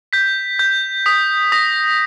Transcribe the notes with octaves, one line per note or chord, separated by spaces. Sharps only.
G6 B6
G6
D#6 B6
D#6 A#6